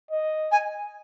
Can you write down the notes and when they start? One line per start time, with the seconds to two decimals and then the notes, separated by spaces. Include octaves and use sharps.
0.11 D#5
0.51 G#5